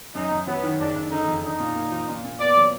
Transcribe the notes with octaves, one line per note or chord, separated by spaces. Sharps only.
F#2 D#4
F#2
F#3 B3
D#3
F#1 D4
F#1
D3 D#4
F2
D4 D#4
A#2
A#3
F3
A#2
A#2
B3 D5
F#3